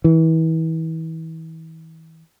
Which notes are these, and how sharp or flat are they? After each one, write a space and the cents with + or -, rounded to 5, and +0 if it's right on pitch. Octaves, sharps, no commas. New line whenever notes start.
E3 -35